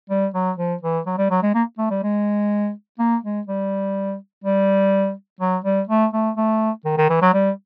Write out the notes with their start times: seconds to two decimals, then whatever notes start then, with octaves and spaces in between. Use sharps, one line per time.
0.10 G3
0.34 F#3
0.58 F3
0.83 E3
1.07 F#3
1.18 G3
1.31 F#3
1.43 G#3
1.55 A#3
1.79 A3
1.91 G3
2.03 G#3
2.99 A#3
3.24 G#3
3.48 G3
4.44 G3
5.41 F#3
5.65 G3
5.89 A3
6.14 A3
6.37 A3
6.86 D#3
6.98 D#3
7.10 E3
7.22 F#3
7.34 G3